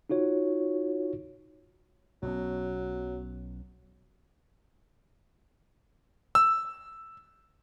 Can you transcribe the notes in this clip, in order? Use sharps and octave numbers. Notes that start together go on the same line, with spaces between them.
D#4 F4 F#4 C#5
B1 F#3 B3 C#4
E6